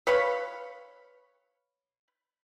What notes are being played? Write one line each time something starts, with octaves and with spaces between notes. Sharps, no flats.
B4 C#5 F5 B5